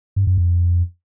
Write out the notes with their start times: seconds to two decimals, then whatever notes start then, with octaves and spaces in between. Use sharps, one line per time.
0.16 G2
0.27 F#2
0.38 F2